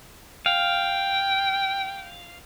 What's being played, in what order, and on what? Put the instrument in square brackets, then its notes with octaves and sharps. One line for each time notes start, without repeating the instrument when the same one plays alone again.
[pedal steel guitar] F5 [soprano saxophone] G5